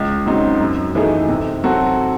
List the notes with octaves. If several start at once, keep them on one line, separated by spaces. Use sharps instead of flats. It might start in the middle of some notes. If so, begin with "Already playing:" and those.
Already playing: C#2
C#3 F#3 C4 D#4
F#2
E3 A3 D#4 G#4
C3
F#3 C4 F#4 A4